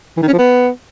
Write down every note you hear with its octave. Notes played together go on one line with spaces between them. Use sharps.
E3
D#3
C#4
F3
B3